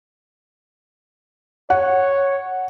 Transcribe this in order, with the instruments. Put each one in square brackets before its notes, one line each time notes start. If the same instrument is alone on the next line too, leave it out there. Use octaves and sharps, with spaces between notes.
[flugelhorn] C#5 [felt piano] F#5